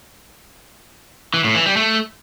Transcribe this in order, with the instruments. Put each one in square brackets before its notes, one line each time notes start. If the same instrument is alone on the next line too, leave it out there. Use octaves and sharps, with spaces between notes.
[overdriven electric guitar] E3
A2
E3
G3
A3